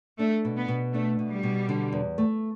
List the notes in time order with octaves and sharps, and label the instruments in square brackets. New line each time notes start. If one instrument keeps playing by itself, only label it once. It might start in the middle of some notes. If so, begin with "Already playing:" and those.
[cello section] A3 [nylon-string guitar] D4
[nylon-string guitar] B2
[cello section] B3
[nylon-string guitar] B2
[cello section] A3 [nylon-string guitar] D4
[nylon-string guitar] B2
[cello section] G3
[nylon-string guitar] B2
D3
E2
A3